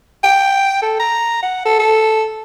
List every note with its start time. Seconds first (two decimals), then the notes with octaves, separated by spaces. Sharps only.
0.24 G5
0.82 A4
1.00 A#5
1.43 F#5
1.66 A4
1.79 A4